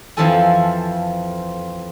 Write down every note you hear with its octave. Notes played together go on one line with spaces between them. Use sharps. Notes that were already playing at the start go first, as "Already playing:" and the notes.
F2 E3 F3 F4 A4 G#5